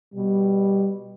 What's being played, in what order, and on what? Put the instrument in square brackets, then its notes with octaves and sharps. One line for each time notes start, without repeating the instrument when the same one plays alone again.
[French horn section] B2 G3